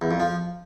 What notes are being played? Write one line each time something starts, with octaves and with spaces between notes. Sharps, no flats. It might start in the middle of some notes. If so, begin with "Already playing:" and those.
E2
F2
F3